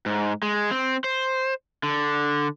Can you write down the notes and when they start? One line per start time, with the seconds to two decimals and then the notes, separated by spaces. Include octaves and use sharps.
0.06 G#2
0.43 G#3
0.71 C4
1.04 C5
1.83 D3